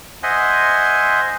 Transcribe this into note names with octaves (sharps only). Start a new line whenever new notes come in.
C5 D#5 E5 F#5 G#5 C6